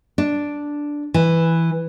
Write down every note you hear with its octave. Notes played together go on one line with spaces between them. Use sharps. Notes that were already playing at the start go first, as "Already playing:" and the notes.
D4
E3